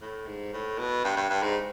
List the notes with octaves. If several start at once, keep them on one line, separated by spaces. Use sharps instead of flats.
A2
G#2
A2
B2
G2
G2
G2
G#2